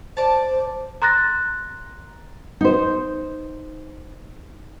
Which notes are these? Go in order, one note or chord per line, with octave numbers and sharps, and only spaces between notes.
C5 D5 A5
A#5 C6 F#6 A6 A#6
D#4 C5